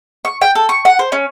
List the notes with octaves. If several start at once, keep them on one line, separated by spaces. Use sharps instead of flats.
C#6
G5
A4
C#6
F#5
C5
C#4